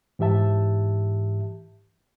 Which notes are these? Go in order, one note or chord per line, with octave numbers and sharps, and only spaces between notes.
G#2 E3 G4 E5 A5